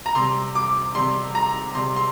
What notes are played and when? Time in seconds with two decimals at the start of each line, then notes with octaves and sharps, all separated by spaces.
0.06 A#5
0.15 C3 G3 C6
0.55 D6
0.95 C3 G3 C6
1.35 A#5
1.75 C3 G3 C6
1.96 C6